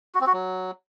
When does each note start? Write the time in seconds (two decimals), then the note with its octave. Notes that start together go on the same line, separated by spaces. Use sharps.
0.15 F#4
0.21 C4
0.27 F#4
0.33 F#3